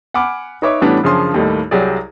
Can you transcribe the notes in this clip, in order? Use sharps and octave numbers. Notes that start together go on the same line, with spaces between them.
F#5 G#5 B5 D6 F6
D#4 B4 C#5 E5 D6
A2 E3 G3 B3 C#4 D4
F#2 C#3 F3 D4 C6 D#6
D#2 A2 G3 A3 A#3 D#4
C2 F#3 G4 G#4 D5